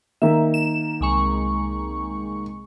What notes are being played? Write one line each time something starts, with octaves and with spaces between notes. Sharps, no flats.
D#3 A#3 E5
E7
C2 G#3 C#6